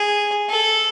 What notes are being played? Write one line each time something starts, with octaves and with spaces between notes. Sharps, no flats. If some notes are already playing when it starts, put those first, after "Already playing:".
Already playing: G#4
A4